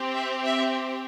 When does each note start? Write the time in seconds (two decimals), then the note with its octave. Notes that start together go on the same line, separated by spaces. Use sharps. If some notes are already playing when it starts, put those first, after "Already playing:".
Already playing: C4 G4
0.14 E5
0.45 E5